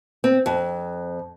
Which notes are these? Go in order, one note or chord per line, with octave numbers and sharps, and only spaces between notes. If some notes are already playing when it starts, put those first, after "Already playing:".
C4
F2